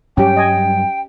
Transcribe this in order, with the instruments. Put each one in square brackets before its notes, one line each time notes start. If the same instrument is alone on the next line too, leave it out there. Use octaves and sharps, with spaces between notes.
[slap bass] G2 F#3 G3 [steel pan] C#4 G4 [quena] G5
[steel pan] D#5 G#5